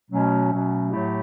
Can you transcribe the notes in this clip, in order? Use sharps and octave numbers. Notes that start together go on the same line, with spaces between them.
B2 F#3 A3 C#4
B2 F#3 A3 C#4
A2 F#3 A3 E4 G4